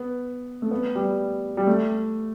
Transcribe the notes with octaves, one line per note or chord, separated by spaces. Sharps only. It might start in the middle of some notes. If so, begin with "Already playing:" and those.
Already playing: B3
A3
B3
G3
G3
A3